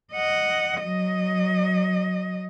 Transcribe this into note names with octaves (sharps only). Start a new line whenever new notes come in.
D#5 F#5
F#3 D#5